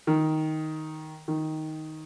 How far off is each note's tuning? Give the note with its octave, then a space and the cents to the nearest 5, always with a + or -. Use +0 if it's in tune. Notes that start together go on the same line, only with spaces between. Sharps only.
D#3 +5
D#3 +5